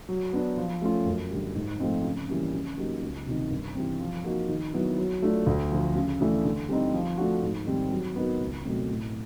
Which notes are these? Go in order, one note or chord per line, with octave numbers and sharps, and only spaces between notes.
F#3
B3 D4
F3
A3 C#4 F4
F#2
D3 G3
G#2
F3 A3 C4 D#4
C#3
E3 G3 A#3 C#4
C#3
F#3 A#3 D#4 G4
C#2
C3 D#3
G2
E3 G3 C4
F3
A#3 D#4 F#4
D#3
F#3 B3 E4
F#3
A3 D4 F4
D2
D3 F3
C#3
E3 A3 D4
D3
G3 C4 D#4
F3
A3 D4 F#4
G#2
D#3 G3 C4
F#3
B3 D#4 F#4 A#4
C#2
B2 F#3 A3 C4
A2